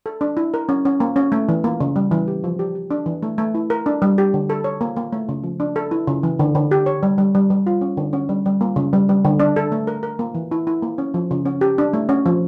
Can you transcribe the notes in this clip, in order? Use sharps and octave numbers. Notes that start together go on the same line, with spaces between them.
A4
D4
E4
A#4
C#4
C#4
A#3
C#4
A3
E3
A#3
C#3
G3
E3
G4
F3
G4
G4
D4
E3
A3
A3
E4
A#4
D4
G3
G4
D3
A4
C#5
A#3
A#3
A3
C#3
F3
D4
A4
E4
C#3
E3
D3
D3
G4
C#5
G3
G3
G3
G3
F4
C#4
D3
C#4
G3
G3
A#3
C#3
G3
G3
D3
D4
A4
A3
A#4
A#4
A#3
E3
E4
E4
A#3
C#4
F3
C#3
C#4
G4
D4
A3
C#4
F3